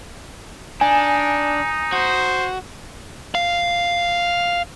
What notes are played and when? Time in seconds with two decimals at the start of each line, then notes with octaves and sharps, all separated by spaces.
0.81 D4 D#4 G#5
1.92 F#4 C5
3.35 F5